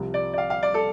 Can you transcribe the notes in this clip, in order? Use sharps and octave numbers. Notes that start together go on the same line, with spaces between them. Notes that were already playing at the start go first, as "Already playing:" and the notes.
Already playing: C2 C3 F3
D5
D5
F5
F5
D5
A4